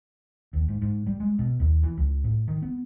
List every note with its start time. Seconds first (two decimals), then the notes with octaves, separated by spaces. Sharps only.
0.53 D#2
0.69 G#2
0.82 G#2
1.07 G3
1.20 G#3
1.39 B2
1.60 D#2
1.83 E3
1.97 C#2
2.24 A2
2.48 D#3
2.62 B3